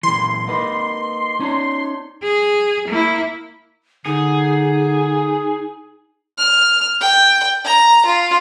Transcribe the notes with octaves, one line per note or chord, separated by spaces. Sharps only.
A#2 E3 C6
A#3 D#4 B4
C#4 D#4 A#5
G#4
A#3 E4
D3 D#4 G#4
F6
G5
A#5
F4